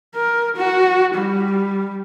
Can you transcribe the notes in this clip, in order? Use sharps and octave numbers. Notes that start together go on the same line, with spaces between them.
A#4
F#4
G3